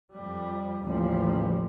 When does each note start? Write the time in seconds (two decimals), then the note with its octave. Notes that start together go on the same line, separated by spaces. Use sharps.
0.14 F2 G3
0.84 A1 D#2 C#3 F3 G3